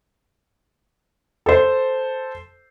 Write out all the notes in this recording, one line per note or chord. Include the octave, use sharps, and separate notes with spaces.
A4 C5